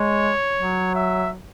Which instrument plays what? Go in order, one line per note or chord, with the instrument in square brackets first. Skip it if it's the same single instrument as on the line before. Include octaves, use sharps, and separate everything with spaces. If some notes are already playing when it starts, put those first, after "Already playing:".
Already playing: [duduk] G#3 [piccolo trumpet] C#5
[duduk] F#3
[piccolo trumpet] E5